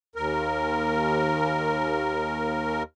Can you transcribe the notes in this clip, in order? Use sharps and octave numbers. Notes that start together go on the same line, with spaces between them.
D#2 A#4